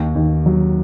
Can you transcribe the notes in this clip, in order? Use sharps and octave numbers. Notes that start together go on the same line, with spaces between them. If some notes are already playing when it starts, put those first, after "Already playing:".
Already playing: D#2 D#3
D#2
F#3